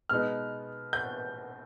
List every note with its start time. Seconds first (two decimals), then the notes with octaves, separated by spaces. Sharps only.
0.09 B2 G#3 B3 D#4 F6
0.93 G6